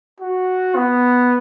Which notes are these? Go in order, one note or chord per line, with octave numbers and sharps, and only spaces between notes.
F#4
B3